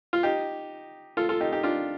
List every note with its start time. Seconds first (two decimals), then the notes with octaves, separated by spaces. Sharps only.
0.13 F4
0.23 D#4 G4
1.17 F4 A4
1.29 F4 A4
1.41 D#4 G4
1.52 D#4 G4
1.63 D4 F4